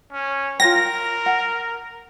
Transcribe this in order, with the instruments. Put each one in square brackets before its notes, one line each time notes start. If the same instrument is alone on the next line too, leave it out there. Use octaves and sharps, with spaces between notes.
[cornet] C#4
[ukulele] F4 C#5 G5 [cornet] A#4 [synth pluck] A#6
[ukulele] F#5